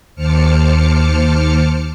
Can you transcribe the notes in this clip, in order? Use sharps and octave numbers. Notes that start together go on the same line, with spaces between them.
D#2 C5 A5 D6 F6 C#7